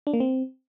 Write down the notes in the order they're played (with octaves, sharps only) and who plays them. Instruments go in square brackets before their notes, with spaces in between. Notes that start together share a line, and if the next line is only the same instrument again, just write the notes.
[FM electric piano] D4
A#3
C4